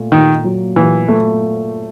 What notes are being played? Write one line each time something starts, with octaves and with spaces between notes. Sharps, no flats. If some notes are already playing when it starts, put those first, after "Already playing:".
Already playing: A#2 A3
A#2 D#3
F#3
A#2 E3
A3